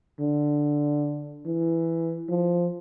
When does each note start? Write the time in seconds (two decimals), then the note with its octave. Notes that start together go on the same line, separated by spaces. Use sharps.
0.20 D3
1.46 E3
2.29 F3